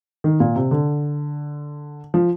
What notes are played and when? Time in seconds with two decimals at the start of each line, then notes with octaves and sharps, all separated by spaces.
0.24 D#3
0.40 A#2
0.56 C3
0.71 D3
2.14 F3